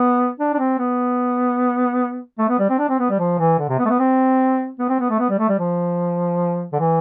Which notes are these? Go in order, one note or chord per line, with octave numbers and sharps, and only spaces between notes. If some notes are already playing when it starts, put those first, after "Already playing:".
Already playing: B3
D4
D4
C4
B3
A3
B3
G3
C4
D4
C4
B3
G3
F3
E3
D3
C3
B3
A3
B3
C4
B3
C4
B3
A3
B3
G3
A3
G3
F3
D3
E3